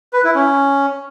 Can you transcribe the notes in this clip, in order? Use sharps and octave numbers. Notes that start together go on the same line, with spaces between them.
B4
E4
C#4